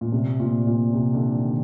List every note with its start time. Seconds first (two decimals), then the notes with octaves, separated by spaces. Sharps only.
0.01 A#2
0.12 C3
0.40 A#2
0.67 A#2
0.93 C3
1.14 D3
1.34 D#3